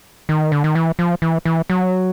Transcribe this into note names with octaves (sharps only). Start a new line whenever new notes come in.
D#3
D3
D#3
E3
F3
E3
E3
F#3